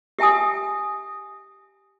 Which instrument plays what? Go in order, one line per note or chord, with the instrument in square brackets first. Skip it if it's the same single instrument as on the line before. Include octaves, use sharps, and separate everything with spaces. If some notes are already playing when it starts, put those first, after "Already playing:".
[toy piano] G4 E5 G5 G#5 D#6